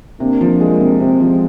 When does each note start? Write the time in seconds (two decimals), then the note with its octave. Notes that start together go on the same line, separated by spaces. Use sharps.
0.20 C3 A#3 D4
0.41 F3
0.60 G#3
0.80 C3
1.00 C3 G#3 C4
1.20 F3